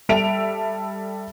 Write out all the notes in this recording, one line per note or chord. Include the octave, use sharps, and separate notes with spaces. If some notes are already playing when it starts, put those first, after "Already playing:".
G3 A4 E5 D7 F7